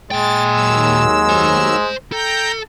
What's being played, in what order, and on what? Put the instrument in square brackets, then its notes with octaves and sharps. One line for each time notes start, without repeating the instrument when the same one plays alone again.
[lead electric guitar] A#2 G5 [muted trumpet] G#3 [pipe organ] A6
[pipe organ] D#2 F#3 E6
[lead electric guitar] C5 G#5
[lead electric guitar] A4 [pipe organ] G5 A#5 G6